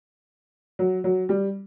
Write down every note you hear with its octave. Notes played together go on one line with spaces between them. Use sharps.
F#3
F#3
G3